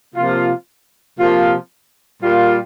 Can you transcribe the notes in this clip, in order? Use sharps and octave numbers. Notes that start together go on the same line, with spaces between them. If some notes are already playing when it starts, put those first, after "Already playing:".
C3 F3 A#3 F4
C3 F3 A#3 F4
A#2 G3 A#3 F4